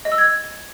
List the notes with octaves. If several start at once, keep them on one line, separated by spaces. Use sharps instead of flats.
D#5
E6
G#6